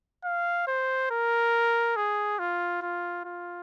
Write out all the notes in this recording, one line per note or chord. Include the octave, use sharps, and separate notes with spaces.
F5
C5
A#4
G#4
F4
F4
F4